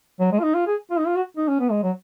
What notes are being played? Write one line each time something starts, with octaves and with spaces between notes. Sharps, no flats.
F#3
G#3
F4
D#4
F4
G#4
F4
D#4
F4
F#4
D#4
C#4
B3
G#3
F#3